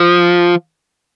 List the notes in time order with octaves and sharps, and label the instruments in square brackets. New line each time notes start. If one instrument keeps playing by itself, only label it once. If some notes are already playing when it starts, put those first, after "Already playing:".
Already playing: [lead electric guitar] F3